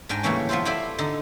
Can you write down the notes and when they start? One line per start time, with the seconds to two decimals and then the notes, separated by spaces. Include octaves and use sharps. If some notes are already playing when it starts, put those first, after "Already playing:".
0.09 G#2 D4 G5 G#5 A#5
0.23 A2 C#3 E3 G3 A#3 C#4
0.49 F3 B3 F4 A4 C5
0.65 E4 F4 A4 C5 D5 E5
0.98 D3 D#4